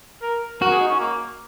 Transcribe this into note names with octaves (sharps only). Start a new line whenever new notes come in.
A#4
F#4 A#4
G#4
D#4
C#4
A#3